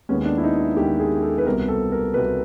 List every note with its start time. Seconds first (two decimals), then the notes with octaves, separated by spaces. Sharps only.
0.09 D#2 D#3 G#3 B3 C#4
0.25 D4
0.38 E4
0.44 D#4
0.60 E4
0.77 D#2 D#3 G#3 B3 G4
1.00 G#4
1.22 A4
1.38 B4
1.46 C2 B2 G3 B3 A#4
1.68 A4
1.92 A#4
2.14 C2 B2 G3 B3 B4